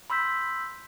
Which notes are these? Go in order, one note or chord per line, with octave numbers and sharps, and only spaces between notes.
B5 C6 E6 G6 B6